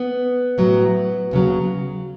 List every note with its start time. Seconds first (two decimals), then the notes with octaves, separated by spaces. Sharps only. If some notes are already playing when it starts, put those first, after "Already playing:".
Already playing: B3
0.58 A2 F#3
1.31 D#2 C#3 F#3